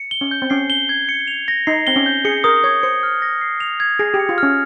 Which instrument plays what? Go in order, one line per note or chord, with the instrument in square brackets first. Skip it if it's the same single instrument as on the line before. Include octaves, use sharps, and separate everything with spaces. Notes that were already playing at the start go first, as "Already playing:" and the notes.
Already playing: [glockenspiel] C#7
G7
[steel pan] C#4
[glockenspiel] G6
[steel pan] C4
[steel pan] C#4 [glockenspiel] C7
[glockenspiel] G7
G#6
C#7
F7
A#6
[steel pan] D#4 [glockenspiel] C7
[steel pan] C4 [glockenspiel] G7
[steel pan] C#4
[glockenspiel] G6
[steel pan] G#4 [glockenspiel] C#7
[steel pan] A#4 [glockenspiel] D#6
[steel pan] C#5 [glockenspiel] G#6
[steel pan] C5 [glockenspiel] C#7
[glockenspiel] F6
A#6
C7
F7
G#6
[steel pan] G#4 [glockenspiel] A#6
[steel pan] G4
[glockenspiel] C#7
[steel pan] F4
[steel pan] C#4 [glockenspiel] F6